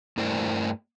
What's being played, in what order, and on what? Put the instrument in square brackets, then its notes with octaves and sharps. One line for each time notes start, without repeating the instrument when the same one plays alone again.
[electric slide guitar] G2 A3 E4 A#4 C5 D5